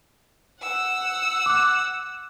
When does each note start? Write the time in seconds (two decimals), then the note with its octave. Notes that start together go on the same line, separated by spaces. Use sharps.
0.61 F#5 E6
1.46 D6 F#6